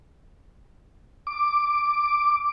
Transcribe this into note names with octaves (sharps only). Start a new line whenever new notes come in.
D6